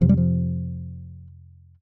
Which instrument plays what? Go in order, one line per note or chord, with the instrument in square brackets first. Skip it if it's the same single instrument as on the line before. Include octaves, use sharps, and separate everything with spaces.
[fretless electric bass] F2 C3 F3
G3
F3